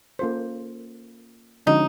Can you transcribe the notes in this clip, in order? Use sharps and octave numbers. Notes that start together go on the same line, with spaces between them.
A#3 C#4 F4 A4 C5
D3 F3 G#3 C#4 D#4 F#4